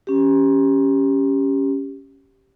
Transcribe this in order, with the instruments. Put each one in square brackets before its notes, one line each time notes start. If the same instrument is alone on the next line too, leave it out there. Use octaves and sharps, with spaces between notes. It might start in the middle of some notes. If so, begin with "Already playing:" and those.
[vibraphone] C#4 G4